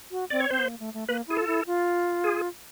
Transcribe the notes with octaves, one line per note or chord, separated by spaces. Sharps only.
F#4
C4 D5
C#5
C4 C5
B3
A#3
A3
A3
A#3 B4
E4 G#4
F4 A4
E4
F4
G#4